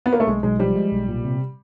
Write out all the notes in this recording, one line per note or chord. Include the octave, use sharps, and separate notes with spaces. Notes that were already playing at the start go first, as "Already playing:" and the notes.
B3
A#3
A3
B1 G#3
B1 G#3
F3 G3
G#3
B1
A#2
C3